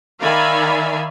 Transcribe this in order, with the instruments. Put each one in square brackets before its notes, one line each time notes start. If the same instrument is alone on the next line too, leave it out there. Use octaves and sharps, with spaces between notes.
[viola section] D#3 D5 E5 F5 G#5 B5